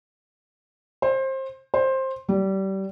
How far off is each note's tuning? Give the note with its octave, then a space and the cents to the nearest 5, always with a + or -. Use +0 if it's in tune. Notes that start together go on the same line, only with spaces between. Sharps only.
C5 +25
C5 +15
G3 -25